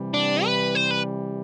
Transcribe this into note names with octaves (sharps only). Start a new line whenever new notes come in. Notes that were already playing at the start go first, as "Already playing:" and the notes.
Already playing: C3 E3 G3
D4
B4
C5
B4